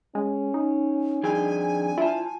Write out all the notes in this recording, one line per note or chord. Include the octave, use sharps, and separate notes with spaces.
G#3 C#4
D#4
F2 D4 G#4 G5 G#5
E4 F4 A5